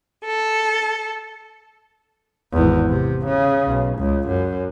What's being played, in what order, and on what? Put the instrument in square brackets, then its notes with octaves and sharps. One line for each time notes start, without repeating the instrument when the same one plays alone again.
[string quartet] A4
[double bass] G#1 E2
C3
C#3
B1
C#2
F#2